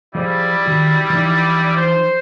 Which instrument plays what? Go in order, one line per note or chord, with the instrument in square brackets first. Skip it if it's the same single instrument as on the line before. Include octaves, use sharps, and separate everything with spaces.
[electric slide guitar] F3 G#4 C5 [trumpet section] G3 E4 D5
[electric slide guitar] D#3 F#4 G#4
E3 F3 D#4
[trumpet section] C5